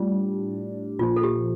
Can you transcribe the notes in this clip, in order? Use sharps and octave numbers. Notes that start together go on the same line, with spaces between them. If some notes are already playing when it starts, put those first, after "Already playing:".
Already playing: A2 G3 D4 F4
A#1 A#2 F3 F4
A4
G4